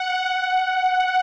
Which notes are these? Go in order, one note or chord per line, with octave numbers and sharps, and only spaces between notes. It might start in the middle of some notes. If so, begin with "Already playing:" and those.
Already playing: F#5
F#5